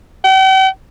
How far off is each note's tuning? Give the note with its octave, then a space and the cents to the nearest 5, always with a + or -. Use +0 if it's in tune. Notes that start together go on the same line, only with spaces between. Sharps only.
G5 -45